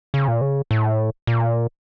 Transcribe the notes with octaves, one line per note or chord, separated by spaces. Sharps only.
C#3
A#2
C#3
A2
A#2